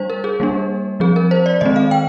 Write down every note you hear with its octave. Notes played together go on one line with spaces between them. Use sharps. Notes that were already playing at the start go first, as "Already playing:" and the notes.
Already playing: G3 D4 C5
A#4
G#4
G3 A#3 D4
F3 C4 G#4
A#4
C5
D5
D#3 G#3 C4 D#5
F5
G5